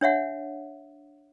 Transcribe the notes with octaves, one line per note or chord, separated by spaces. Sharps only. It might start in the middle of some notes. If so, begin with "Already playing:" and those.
D4 C#5 E5 F#5